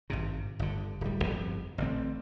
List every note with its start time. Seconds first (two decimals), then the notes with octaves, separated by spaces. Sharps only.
0.10 G#1 G2 C3
0.59 G1 D3
1.01 D1 G3
1.24 G1 F2
1.78 A1 D3 C4